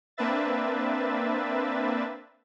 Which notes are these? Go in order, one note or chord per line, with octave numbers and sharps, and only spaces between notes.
A#3 C4 D4 B4 E5 A6